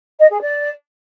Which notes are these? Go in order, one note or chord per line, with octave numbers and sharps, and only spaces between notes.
D#5
G#4
D5